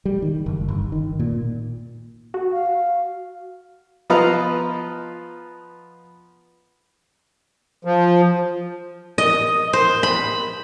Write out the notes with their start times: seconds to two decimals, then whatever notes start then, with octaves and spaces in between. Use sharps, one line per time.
0.05 G3
0.22 D#3
0.46 F#1
0.68 G1
0.92 D#3
1.20 A#2
2.34 F#4
2.52 F5
4.10 F3 B3 B4 D#5 F5 A#5
7.85 F3
9.18 D#5
9.73 C5
10.03 B5